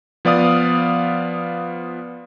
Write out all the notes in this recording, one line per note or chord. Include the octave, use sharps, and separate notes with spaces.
F3 B3 D5 F5 D#6